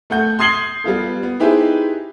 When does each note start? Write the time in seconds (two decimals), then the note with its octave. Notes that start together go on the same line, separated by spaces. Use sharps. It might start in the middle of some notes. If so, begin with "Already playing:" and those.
0.10 A3 A4 F#5 G6
0.39 C6 D#6 G#6 C7 F#7 G7
0.84 G3 B3 F4 A4
1.23 B3
1.40 D#4 E4 G4 G#4 B4 C5